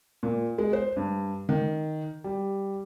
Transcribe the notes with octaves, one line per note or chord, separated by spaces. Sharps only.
A#2
G#3
C5
G2
D#3
G3